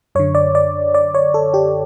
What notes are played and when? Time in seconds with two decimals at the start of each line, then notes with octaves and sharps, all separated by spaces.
0.15 F#2 D3 C#5
0.35 D5
0.55 D5
0.94 D5
1.14 C#5
1.34 A4
1.54 G4